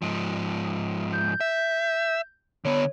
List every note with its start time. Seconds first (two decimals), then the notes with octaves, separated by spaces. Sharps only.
0.02 G#2 F3
1.13 G6
1.41 E5
2.65 D3 B3 C#5